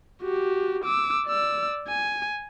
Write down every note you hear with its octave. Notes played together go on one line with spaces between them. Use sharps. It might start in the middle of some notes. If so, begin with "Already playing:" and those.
F#4 G4
D6 E6
D5 E6
G#5